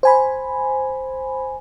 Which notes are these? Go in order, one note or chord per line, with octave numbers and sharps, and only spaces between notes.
C5 G#5 B5